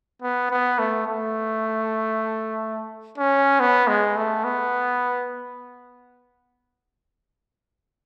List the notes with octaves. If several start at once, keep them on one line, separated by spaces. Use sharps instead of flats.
B3
B3
A3
A3
C#4
B3
G#3
A3
B3